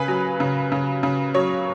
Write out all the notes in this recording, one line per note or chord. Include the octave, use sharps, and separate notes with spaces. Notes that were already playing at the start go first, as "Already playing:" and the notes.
Already playing: C#3 B4 G#5
F#3
C#3
C#3
C#3
F#3 C#5